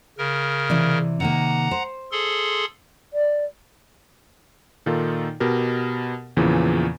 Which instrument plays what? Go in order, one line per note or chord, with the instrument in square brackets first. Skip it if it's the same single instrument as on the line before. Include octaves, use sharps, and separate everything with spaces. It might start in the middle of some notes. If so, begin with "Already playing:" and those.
[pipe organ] C#3 A#4
[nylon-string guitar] C3 E3 D5
[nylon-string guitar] C3 D#3 A#3 [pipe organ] F#5 A#5
[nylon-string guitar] C5
[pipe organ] G#4 A4 C6
[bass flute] D5
[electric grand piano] A#2 D#3 D#4 F4 A4
B2 G4 A#4
E2 A#2 C#3 E3 F3